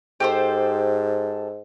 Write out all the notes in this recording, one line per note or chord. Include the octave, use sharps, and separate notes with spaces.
G#2 G4 A4 C5